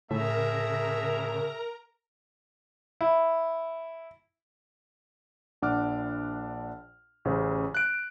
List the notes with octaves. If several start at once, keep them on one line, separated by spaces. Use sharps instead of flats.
A2 C#3 A3 G#4 A#4 E5 A#5
E4
A#1 D4 F#5 D6 F6
A1 C#3 C5
F#6 D7